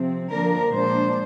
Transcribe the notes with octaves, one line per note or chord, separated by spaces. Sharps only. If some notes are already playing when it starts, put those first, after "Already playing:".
Already playing: C3 F3 C4
D3 F3 A#3 D4 A#4
A#2 G#3 D4 C5